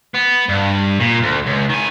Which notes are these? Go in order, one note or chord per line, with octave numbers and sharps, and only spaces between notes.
B3
G2
A#2
D2
C#2
D#3 G#5